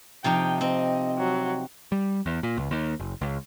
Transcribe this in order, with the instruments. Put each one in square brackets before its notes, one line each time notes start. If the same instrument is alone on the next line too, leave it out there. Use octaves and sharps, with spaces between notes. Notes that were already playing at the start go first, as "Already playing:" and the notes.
[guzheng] C3 F3 D#4 [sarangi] G5
[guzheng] C4 [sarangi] D#5
[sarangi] F#3
[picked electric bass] G3
E2
A#2
C#2
D#2
F#1
C#2